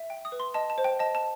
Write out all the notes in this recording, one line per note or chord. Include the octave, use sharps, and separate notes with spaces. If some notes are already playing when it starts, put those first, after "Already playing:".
Already playing: E5
G5
D#6
B4
C6
D#5 A5
A5
C5
G5
D#5 A5
A5